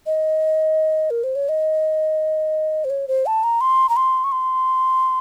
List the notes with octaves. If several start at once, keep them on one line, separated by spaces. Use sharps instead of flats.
D#5
A#4
C5
C#5
D#5
C5
C#5
C5
A5
A#5
C6
A#5
C6
C#6
C6